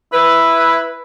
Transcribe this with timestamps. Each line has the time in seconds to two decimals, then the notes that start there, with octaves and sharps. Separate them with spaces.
0.13 E4 B4